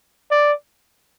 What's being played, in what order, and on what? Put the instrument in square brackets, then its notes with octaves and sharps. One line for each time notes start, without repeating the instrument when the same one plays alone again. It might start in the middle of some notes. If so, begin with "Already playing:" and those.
[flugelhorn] D5